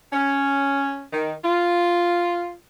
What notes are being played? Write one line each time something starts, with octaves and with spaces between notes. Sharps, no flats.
C#4
D#3
F4